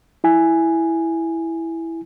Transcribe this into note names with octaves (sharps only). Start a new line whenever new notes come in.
E4 G#5